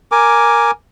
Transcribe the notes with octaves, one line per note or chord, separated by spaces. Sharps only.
A#4 G#5 D6